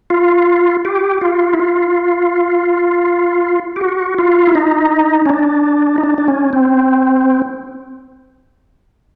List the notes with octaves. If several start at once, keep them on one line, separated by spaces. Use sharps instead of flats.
F4
G4
F4
E4
F4
G4
F#4
F4
E4
D#4
C#4
D4
D#4
D4
D4
C#4
C4